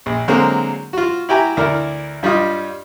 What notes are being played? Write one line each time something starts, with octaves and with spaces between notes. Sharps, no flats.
A#1
D3 F#3 G#3 A#3 C4
F4 F#4
E4 F#4 G4 G5 G#5 A#5
D2 D4 E4 A#4
G2 G3 D4 F4 D#5